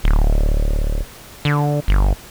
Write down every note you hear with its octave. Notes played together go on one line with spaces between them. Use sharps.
D1
D3
G1